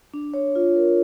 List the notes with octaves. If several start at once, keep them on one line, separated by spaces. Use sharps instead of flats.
D4
C#5
F4
A#4